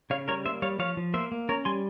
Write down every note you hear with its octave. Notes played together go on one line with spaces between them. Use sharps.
C#3 C#5 F5
G3 A#4 C#5
A#3 C5 E5
G3 C#5 F5
F3 C#5 F5
F3
A#3 C5 E5
A#3
C#4 A#4 C#5
G3 G#5 C6